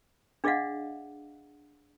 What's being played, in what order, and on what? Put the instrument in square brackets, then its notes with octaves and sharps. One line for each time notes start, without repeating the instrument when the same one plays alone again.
[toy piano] D4 G#4 D5 D#5 F5 F#5